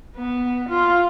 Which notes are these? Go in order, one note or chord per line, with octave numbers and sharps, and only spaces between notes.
B3
F4